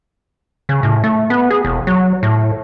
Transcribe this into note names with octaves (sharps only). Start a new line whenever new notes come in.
C#3
A2
A3
B3
G#4
E1
F#3
A2